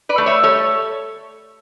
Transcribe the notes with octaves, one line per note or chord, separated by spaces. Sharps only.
B4 D5
A3
C#5 E5
G3 A4 C#5